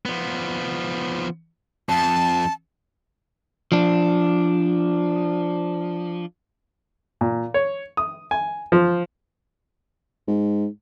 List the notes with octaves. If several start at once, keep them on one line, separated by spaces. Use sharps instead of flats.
F3 B3
F2 A5
F3 D4
A#2
C#5
D#6
G#5
F3
G#2